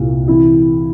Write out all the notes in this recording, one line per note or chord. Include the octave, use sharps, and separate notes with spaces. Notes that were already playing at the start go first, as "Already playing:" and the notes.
Already playing: C2 A#2
C3 E3 E4